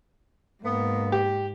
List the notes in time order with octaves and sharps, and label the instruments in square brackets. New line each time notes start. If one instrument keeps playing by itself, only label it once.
[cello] G#2 [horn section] A#3 B3
[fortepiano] G4